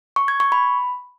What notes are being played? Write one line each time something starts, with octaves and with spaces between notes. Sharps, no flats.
C#6
G#6
C#6
B5